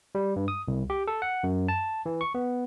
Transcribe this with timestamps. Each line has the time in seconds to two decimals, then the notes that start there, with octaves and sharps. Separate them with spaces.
0.15 G3
0.36 G2
0.48 D#6
0.68 C2
0.90 G4
1.07 A4
1.22 F#5
1.43 F#2
1.68 A5
2.06 E3
2.21 C#6
2.35 B3